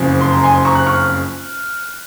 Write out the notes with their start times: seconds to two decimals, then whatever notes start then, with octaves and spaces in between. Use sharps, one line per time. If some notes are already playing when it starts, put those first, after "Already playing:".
Already playing: F#1 F2 C#3
0.21 C6
0.32 A#5
0.44 G#5 C6
0.65 A#5 C#6
0.75 F#6
0.86 C#6 F6